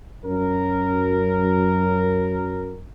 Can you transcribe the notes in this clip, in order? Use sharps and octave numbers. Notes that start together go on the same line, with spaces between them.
F#2 A#4